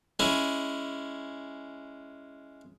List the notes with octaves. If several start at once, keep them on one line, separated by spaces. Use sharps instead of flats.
G#3 C#4 E4